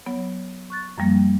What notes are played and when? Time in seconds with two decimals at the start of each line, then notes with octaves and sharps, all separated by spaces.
0.06 F#3 B3 C#5
0.70 C#6 F#6 A6
0.98 F#2 F3 G3 A#3